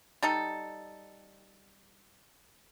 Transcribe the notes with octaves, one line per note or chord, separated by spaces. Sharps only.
G3 D#4 A4